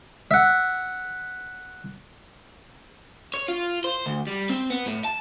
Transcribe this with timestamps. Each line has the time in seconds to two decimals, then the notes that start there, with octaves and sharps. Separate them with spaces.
0.31 E5 F#5
3.34 C#5
3.48 F4
3.84 C5
4.06 D2
4.27 G3
4.50 C4
4.71 B3
4.86 A2
5.05 A5